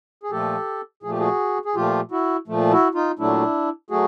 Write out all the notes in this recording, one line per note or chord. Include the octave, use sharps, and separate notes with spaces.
G#4
A#2 F3 A3 G4 A4
A#2 F3 A3 G#4
G4
F#4 G#4
G#4
A#2 F3 A3 F4 G4
E4 F#4
A#2 F3 A3
E4 F#4
D#4 F4
A#2 F#3 A3 D4 E4
F#3 A3 F#4 G#4